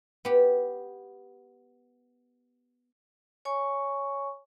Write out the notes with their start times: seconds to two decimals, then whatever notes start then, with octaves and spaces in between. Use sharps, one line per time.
0.25 B3 G4
3.45 C#5 G#5 C#6